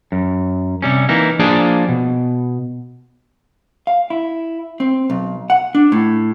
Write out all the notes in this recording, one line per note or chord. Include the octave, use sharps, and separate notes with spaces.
F#2
C3 G3 C#4
E3 A#3 D#4 E4
F3 A#3 D4 G#4 C5 D5
B2
F5
E4
C4
B1
F#5
D4
A2